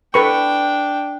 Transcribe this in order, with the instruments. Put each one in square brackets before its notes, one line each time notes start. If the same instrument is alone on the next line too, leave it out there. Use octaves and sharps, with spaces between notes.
[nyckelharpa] D4 G5 [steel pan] A4 B4 C#6